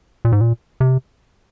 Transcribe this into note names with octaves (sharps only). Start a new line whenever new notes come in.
A#2
G#2
A#2
C3